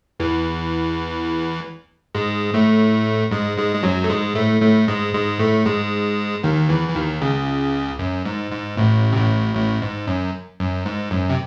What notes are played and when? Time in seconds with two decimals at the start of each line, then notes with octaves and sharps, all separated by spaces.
0.20 E2 E3
2.15 G#2 G#3
2.54 A2 A3
3.31 G#2 G#3
3.58 G#2 G#3
3.75 G#3
3.83 F#2 F#3
4.04 A3
4.10 G#2 G#3
4.35 A2 A3
4.61 A2 A3
4.88 G#2 G#3
5.14 G#2 G#3
5.39 A2 A3
5.65 G#2 G#3
6.44 D#2 D#3
6.69 E2 E3
6.89 E3
6.95 D#2 D#3
7.21 C#2 C#3
7.99 F#2
8.25 G#2
8.52 G#2
8.77 A1 A2
9.13 C3
9.17 A1 A2
9.55 A1 A2
9.82 G#2
10.07 F#2
10.60 F#2
10.85 G#2
11.11 F#2
11.30 C3